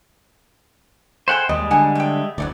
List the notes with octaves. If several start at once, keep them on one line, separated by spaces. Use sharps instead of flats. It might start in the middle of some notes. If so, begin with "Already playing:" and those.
A3 G#4 C5 F#5 G5 B5
D#2 G3 G#3 D#5
D3 F#5 G#5 A5
A3 G5
F#1 D2 F#3 D#4 D5